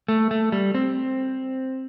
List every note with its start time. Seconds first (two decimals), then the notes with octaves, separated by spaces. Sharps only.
0.08 A3
0.31 A3
0.52 G3
0.75 C4